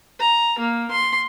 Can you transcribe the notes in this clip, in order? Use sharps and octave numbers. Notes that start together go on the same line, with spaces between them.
A#5
A#3
C6